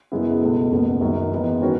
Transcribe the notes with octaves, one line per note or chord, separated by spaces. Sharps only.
F#2 C#3 G#3 B3 E4
C#2 B2 A3
F#1 E2 C#3
F#1 F#2 D#3 F#3
G#2 E3 B3
D#3 G#3 C#4 F#4 B4